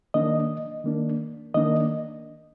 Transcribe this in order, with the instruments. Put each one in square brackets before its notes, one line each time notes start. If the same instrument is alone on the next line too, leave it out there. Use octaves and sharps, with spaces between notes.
[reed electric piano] D#3 A#3 D4 D#5
D#3 A#3 D4
D#3 A#3 D4 D#5